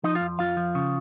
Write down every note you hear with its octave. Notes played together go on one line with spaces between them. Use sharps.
F3 D#4 D#5
F4 F5
F2
F2 F4 F5
F3
C#3